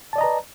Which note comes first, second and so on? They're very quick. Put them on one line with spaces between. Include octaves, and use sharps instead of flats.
A5 D5 D#5 A#5 B4